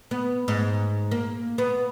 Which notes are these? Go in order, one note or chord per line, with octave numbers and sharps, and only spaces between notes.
B3
G#2
A#3
B3